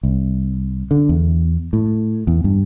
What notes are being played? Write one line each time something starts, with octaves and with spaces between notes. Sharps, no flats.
C2
D3
E2
A2
E2
G2